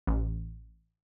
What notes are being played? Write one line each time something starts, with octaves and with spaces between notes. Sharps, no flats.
A1